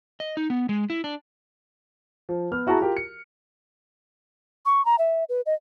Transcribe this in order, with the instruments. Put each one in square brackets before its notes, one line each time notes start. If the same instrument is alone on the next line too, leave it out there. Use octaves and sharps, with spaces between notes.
[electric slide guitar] D#5
D#4
B3
G#3
E4
D4
[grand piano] F3
B3 F6
E4 F#4 G#4 A5 A#5
F4 G4 A#4
C#7
[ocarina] C#6
A#5
E5
B4
D#5